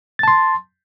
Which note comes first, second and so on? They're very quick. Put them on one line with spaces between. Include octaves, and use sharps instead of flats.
A6 A5 C6